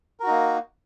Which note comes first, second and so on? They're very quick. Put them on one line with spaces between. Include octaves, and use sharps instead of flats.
A#4 F#4 D#4 A#3